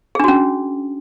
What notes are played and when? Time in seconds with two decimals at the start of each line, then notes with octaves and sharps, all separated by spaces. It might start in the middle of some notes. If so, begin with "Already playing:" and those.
0.15 G#4
0.20 D4
0.24 F#4
0.28 C#4